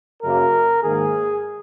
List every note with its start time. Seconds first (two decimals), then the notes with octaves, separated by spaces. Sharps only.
0.23 F#2 C#3 F#3 A#3 A#4
0.83 G#2 D#3 A#3 G#4